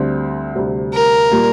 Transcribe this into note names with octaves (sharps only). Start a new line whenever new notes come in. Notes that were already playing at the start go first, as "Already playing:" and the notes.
Already playing: D2 D3 G3 C4
D2 C3 G3
A#4
A#2 G3 A#3